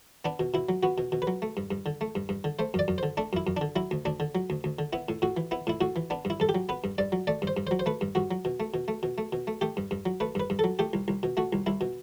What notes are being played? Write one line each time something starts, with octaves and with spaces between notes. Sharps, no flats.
B3 D4
B2
B2 E4
F#3
B3 F#4
B2
B2
B4
F#3
A3
G2
G2
D3
A3
G2
G2
D3
A3 C5
F#2 D5
F#2
D3 C5
A3 D4
F#2 E4
F#2
D3 D4
F#3 E4
D2
D2 D4
D3
F#3
D2
D2
D3
B3 E4
A2
A2 F#4
E3
B3 E4
A2 E4
A2 F#4
E3
B3 D4
G2
E4
G2 A4
G4
F#3
B3 B4
G2
G2 D5
F#3
A3 D5
G2
C5
G2
C5
F#3
C5
A3 B4
G2
G2 F#4
F#3
B2
A3
B2
A3
B2
A3
B2
A3
A3 G4
G2
G2
F#3
A3 B4
G2 B4
G2
F#3 A4
A3 G4
C2
C2
B2
A3 F#4
C2
C2 E4
B2